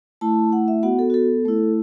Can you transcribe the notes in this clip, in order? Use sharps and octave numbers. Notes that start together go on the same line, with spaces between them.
A3 E4 A5
F#5
E5
B3 F#4 F#5
A4
F#4
A4
A3 E4